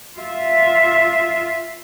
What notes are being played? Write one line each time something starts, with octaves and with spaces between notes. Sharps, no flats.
F4 E5